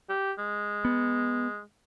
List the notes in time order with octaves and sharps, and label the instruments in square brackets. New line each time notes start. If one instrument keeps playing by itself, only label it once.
[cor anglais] G4
G#3
[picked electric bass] B3